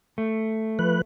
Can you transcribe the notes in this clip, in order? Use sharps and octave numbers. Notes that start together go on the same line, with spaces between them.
A3
F3 B4 F#6